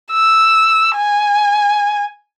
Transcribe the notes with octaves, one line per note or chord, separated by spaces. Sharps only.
E6
G#5